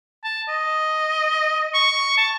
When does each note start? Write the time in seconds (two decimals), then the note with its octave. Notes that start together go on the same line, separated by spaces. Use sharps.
0.24 A5
0.49 D#5
1.74 C#6
2.17 A5